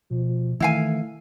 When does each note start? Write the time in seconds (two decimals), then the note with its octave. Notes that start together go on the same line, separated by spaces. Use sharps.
0.11 B2 F3
0.60 D#3 E3 A3 E4 F5 G#5